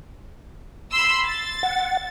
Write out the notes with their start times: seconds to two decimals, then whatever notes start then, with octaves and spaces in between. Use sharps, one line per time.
0.92 B5 C6 E6
1.26 A6
1.63 F#5